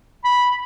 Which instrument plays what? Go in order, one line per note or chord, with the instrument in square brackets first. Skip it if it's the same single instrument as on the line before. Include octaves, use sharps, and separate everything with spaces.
[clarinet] B5